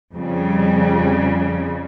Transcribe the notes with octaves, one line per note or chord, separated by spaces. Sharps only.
F2 C#3 G3